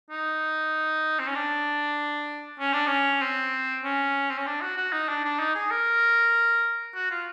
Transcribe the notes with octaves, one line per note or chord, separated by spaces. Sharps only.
D#4
C4
C#4
D4
C#4
D4
C#4
C4
C#4
C4
C#4
D4
F#4
F#4
D#4
D4
D4
D#4
G#4
A#4
F#4
F4